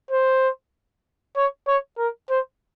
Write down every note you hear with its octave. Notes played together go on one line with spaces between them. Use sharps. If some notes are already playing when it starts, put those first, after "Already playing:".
C5
C#5
C#5
A#4
C5